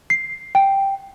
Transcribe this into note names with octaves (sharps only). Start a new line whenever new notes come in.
C7
G5